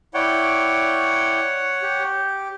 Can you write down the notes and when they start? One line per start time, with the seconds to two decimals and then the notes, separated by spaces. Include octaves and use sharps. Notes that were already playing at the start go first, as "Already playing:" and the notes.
0.14 E4 C#5 D5 F#5 G5
1.82 G4